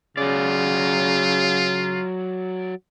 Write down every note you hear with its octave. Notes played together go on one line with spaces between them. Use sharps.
C#3 F#3 F4 D5